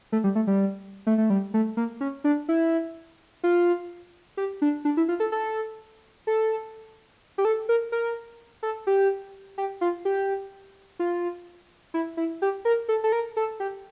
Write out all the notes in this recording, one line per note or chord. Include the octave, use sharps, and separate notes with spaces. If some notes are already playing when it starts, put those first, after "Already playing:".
A3
G3
A3
G3
A3
A3
G3
A3
A#3
C#4
D4
E4
F4
G4
D4
D4
E4
F4
A4
A4
A4
G4
A4
A#4
A#4
A4
G4
G4
F4
G4
F4
E4
E4
G4
A#4
A4
A4
A#4
A4
G4